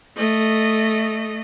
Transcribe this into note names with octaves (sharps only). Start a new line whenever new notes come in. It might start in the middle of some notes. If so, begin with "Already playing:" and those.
A3 D#5